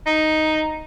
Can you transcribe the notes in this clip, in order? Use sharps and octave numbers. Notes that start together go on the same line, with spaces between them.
D#4